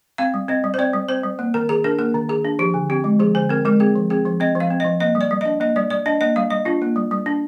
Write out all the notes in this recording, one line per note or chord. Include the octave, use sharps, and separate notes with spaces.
C4 F5
G3
C4 D#5
G3
C5
C4 D5
G3
C4 C5
G3
A#3
D#3 A#4
D#3 G#4
D4 A#4
A#3 A#4
D#3
D#3 G#4
D4
F3 G4
D3
C4 G4
G#3
F3 G#4
D3 C5
C4 A#4
G#3 A#4
C4 G#4
F3
C4 G#4
F3
C4 D#5
F3
F5
C4
F3 D#5
A#3 D#5
G3
D5
G3
D4 D#5
A#3 D#5
G3 D5
G3 D5
D4 D#5
A#3 D#5
G3 F5
G3 D#5
D4 F4
A#3
G3
G3
D4